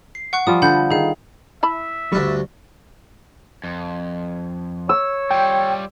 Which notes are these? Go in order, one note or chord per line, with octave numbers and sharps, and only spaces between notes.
C7
F#5 C#6 F#6
F3 G3 F4 D#6
D3 F#5 B5 G6
D#3 G#4 F5
E4 E5 A5 B5
D2 G2 G3 D4 C#6
F2
C#5 E6
G3 F4 G5